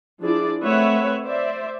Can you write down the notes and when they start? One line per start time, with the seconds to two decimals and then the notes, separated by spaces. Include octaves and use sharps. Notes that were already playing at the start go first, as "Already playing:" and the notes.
0.22 F3 D4 E4 G#4 D5
0.63 A3 C4 B4 C#5 E5 F#5
1.23 C5 D5 E5